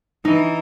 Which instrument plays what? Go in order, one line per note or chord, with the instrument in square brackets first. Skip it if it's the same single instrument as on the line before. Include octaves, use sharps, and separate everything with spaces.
[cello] E3 [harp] D#4